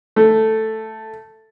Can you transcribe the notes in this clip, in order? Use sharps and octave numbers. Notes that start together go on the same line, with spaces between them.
A3